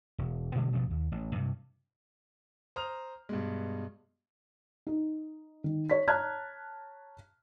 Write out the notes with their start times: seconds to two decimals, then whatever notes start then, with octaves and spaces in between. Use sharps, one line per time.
0.18 E1
0.55 G2 B2 D3 G#3
0.73 A1 G2 B2 F3
0.91 D#2
1.12 A1
1.35 G2 C3
2.76 C5 A#5 D#6 F6 F7
3.29 G2 B2 G#3
4.87 D#4
5.64 D#3
5.90 C#5 B6
6.08 C#5 A5 A#5 F6 F#6 G#6